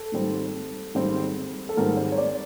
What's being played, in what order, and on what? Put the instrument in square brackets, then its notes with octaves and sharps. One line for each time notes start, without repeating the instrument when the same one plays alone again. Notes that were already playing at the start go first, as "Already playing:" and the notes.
Already playing: [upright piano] A4
G#2 D#3 G3 C4
G#2 D#3 G3 C4
A4
G#2 D#3 G3 C4 A#4
C5
C#5
D5